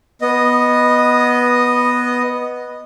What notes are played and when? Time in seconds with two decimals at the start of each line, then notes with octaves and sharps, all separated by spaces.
0.22 B3 D#5